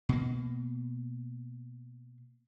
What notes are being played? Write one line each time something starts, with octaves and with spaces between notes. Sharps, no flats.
B2 A#3